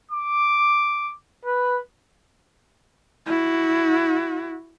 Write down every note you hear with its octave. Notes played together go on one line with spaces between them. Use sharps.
D6
B4
E4 F#4